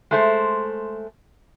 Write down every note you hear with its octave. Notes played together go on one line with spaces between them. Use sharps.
G#3 A3 C5